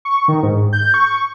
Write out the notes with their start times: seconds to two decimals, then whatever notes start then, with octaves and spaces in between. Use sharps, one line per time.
0.05 C#6
0.28 D#3
0.43 G#2
0.73 G6
0.94 C#6